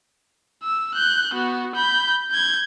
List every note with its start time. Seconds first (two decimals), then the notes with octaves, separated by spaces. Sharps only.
0.63 E6
0.94 F#6 G6
1.34 B3 F#4
1.75 B5 G6
2.31 G6 G#6